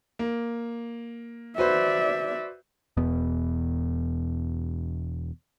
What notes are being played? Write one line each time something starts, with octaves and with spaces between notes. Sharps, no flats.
A#3
F#4 B4 C5 D5 E5
E1 E2 B2 B3